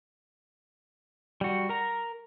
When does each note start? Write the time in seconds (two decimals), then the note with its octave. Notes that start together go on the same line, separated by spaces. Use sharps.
1.41 G3 F#4
1.69 A#4 A#5